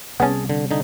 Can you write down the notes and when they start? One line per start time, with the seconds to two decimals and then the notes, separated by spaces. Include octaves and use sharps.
0.20 C3 G3 B3 C#4 G#4 A5
0.50 D3
0.71 D3 D#4